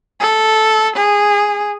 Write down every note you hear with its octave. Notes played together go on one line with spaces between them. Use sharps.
A4
G#4